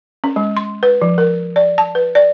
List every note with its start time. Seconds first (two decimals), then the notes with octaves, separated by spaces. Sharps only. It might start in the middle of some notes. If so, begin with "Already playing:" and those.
0.24 C#4
0.36 G#3
0.57 C6
0.83 B4
1.02 F3
1.18 A#4
1.56 D5
1.78 A5
1.95 B4
2.15 D5